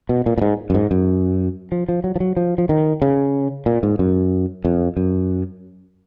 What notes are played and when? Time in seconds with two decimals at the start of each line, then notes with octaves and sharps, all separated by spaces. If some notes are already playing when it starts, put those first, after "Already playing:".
0.09 B2
0.26 A#2
0.38 A#2
0.42 G#2
0.70 F#2
0.74 G#2
0.91 F#2
1.72 F3
1.89 F3
2.04 F#3
2.16 F3
2.20 F#3
2.37 F3
2.58 F3
2.69 D#3
3.02 C#3
3.66 A#2
3.83 G#2
3.99 F#2
4.65 F2
4.97 F#2